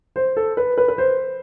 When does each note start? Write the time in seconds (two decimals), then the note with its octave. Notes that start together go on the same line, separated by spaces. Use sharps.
0.16 C5
0.37 A4
0.57 B4
0.78 B4
0.88 B4
0.98 C5